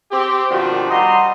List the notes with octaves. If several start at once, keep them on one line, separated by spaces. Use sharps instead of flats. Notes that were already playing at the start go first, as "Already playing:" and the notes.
C4 G4
B2 D#3 F3 D4 F#4
G3 D#5 F#5 A#5 C6